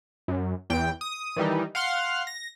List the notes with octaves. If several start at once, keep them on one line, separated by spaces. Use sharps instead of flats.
F#2
E2 G5
D#6
D#3 E3 G3 D#4
F5 F#5 C6 F6
A#6